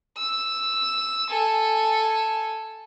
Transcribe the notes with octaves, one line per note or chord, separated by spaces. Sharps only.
E6
A4 G#5